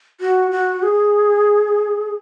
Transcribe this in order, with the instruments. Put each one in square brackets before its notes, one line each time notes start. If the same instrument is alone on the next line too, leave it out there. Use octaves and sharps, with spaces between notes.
[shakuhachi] F#4
F#4
G#4